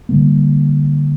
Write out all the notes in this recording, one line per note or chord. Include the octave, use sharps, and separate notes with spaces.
D3 G3 A#3